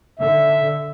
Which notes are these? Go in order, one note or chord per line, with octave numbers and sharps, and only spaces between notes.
D3 E5